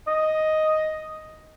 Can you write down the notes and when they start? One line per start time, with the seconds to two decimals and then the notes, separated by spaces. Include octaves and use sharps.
0.07 D#5